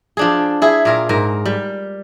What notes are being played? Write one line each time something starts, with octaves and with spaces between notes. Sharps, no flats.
F3 D4 G#4
E4 G#4
A#2 A#4 F5
G#2 A#4
G3